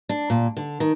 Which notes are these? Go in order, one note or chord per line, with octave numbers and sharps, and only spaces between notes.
D4
A#2
D3
D#3